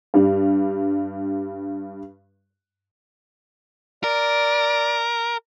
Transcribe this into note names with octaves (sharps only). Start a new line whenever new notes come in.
G2 G3
A#4 D5